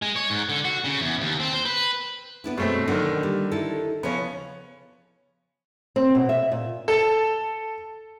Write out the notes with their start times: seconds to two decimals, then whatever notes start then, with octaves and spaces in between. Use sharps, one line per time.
0.02 G#3
0.16 C#5
0.30 G#2
0.49 D3
0.65 F#4
0.84 C#3
1.01 E2
1.21 D#2
1.40 C4
1.53 C5
1.65 B4
2.44 B3 D4 E4
2.57 F#2 B2 G#3 A3 C4
2.88 B2 D3 D#3 F#3 A#3
3.23 G3
3.51 D#4 E4 A4
4.03 C#3 F3 B3 C#5
5.96 C4
6.15 B2
6.29 E5
6.52 A#2
6.88 A4